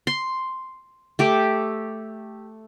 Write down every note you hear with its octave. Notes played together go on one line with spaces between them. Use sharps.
C6
A3 G4 D6